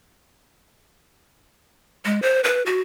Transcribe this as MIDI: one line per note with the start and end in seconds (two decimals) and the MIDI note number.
2.05 2.20 56
2.22 2.41 72
2.44 2.64 71
2.66 2.80 66